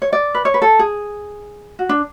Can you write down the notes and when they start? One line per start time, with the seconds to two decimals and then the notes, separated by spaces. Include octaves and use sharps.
0.02 C#5
0.13 D5
0.35 B4
0.45 C#5
0.54 B4
0.62 A4
0.79 G#4
1.79 F#4
1.89 D4